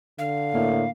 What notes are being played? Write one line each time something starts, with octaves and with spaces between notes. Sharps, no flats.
D3 F5
A2 A#3